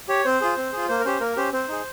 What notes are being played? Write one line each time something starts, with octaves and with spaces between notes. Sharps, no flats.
G4 C#5
C4 C5
F4 G#4
C4
F4 G#4
A#3 C5
A#4
C#4 G4 C5
A#3 A#4
C#4 G4 C5
C4 C5
D#4 G#4